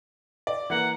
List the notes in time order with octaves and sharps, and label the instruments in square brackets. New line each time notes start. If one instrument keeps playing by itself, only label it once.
[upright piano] D5
[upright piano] E3 A#3 [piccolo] F#5